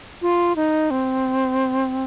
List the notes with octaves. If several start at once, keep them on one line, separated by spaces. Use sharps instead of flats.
F4
D#4
C4